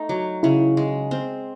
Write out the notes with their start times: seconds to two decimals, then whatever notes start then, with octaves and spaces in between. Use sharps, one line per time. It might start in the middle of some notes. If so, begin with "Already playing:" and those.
Already playing: A3 D#4
0.09 F#3
0.43 C#3 E4
0.77 G#3
1.11 C4